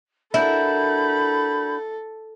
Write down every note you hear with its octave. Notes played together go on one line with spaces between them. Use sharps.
D4 E4 F#4 A4 A#4 B5 G6